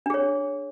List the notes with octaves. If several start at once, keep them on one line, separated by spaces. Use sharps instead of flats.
D4 G#4 C#5